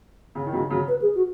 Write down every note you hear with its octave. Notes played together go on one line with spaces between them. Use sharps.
C#3
D#3
C#3 F#3
C#3 F#3
B4
G#4
F#4